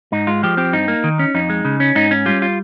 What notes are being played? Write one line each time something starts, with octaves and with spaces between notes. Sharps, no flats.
G#2 D#4
G#3 F4
F3 G4
C4 G4
G2 D#4
A#3
D#3
C#4
F2 D#4
G#3
C#3
C#4
G#2 D#4
C#4
G3 F4
F4